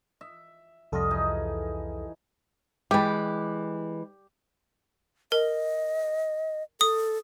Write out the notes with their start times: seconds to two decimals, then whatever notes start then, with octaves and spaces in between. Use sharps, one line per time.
0.21 E5
0.92 C2 F2 G3 F4 A4 D#5
1.11 E3 D#4 G#4
2.91 E3 G3 G#3 G4
5.32 A#4 D#5
6.81 A4 D#6